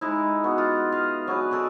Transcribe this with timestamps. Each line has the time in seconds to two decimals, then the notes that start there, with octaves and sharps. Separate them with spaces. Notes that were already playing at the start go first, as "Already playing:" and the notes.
0.01 G#3 D#4 E4
0.44 B3 F#4
0.58 F4
0.92 D#5 F5
1.27 F#3 D4 G#4 B4
1.51 G#4 A4 D5 D#5